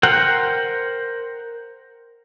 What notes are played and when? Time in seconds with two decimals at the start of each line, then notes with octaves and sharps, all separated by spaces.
0.03 A#4 C5 F#5 G5